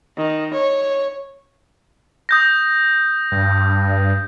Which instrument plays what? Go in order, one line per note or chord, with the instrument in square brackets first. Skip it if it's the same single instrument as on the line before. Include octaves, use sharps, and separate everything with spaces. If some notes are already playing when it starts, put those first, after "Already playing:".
[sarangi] D#3
C#5
[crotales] D#6 G6 A#6
[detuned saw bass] G2